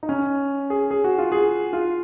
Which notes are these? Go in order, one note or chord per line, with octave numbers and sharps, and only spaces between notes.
D#4
C#4
G#4
G#4
F#4
F4
G#4
F4